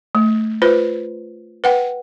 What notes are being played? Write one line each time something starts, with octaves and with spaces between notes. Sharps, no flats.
A3
F4 B4 C5
B4 F#5 G5